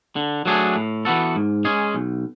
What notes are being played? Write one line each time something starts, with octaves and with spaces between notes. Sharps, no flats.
D3
F#3 A3 D4 G#4
A2
E3 B3 F#4 A4
G#2
G#3 C#4 G#4
B1